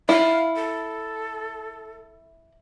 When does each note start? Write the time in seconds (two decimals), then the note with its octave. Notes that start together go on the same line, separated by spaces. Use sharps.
0.09 E4 F5
0.56 A4